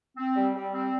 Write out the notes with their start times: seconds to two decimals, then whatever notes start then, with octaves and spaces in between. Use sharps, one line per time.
0.17 C4
0.36 G3
0.54 G3
0.73 C4